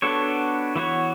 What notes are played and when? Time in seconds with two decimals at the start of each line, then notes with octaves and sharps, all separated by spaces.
0.02 B3 D4 F#4 A4 C#5
0.76 E3 B3 F#4 C#5